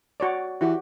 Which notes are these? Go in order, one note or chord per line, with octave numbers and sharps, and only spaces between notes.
F#4 C#5 D5
E3 F#4 G4